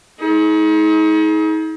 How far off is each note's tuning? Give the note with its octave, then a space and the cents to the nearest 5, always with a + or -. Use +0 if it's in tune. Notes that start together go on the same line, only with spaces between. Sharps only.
D#4 +40 G#4 +40